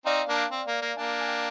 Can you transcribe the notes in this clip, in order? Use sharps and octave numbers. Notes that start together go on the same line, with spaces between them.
C4 D#4 D5 F5
A#3 D4
C4
A#3
A#3
A#3 D4 F5 G#5
G#5
G5